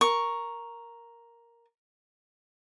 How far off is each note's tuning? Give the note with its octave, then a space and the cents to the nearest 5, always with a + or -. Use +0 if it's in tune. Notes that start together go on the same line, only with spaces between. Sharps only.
A#4 +0 C#6 +0